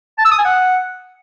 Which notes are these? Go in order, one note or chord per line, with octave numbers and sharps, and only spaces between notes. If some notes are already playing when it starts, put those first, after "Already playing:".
A5
E6
D#6
G#5
F#5